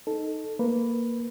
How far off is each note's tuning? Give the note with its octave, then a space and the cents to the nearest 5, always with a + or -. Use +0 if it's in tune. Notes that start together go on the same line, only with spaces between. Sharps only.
D#4 +0 A4 +0
A#3 +0 B4 +0